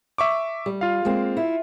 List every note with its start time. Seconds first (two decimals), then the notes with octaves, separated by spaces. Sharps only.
0.18 E5 C#6 D6
0.66 G3
0.81 F4 F5
1.05 G#3 A#3 C4
1.37 E4